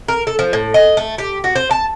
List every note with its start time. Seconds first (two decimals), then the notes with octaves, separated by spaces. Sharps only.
0.08 A#4
0.27 A4
0.39 F3
0.53 A2
0.74 D#5
0.97 A3
1.18 G4
1.44 F#4
1.55 C5
1.71 A5